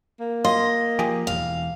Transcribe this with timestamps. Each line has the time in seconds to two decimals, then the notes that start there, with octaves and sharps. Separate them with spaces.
0.20 A#3
0.44 F4 D#5 C6
0.99 F3 G4 G#4
1.27 E1 E2 F5